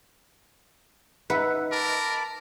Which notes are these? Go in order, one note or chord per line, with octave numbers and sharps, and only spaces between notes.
D#4 B4 E5 F#5
A#4 A5 B5 D6